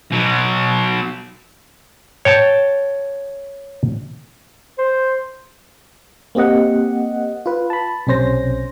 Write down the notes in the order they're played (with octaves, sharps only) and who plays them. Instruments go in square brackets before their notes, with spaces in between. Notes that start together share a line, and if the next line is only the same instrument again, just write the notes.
[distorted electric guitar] B2 F#3
[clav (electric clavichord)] C#5 G5 A5
[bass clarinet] C5
[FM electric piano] A#3 C4 G4 D#5 F#5
F4 B4
A5 B5
B1 C3 C#4 C5 A#6